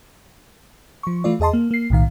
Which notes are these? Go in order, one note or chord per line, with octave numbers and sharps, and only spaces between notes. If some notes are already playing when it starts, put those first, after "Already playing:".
F3 C#6
E3 A3 F4 D5
E2 G#4 D#5 A5 C6
A#3
A#3 C7
B1 A2 D#3 F5